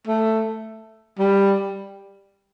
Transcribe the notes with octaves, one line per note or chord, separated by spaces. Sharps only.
A3
G3